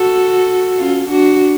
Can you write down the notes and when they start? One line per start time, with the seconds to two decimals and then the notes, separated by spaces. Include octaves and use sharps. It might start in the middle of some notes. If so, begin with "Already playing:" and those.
Already playing: F#4 A4
0.78 C#4 F4
1.08 D4 F#4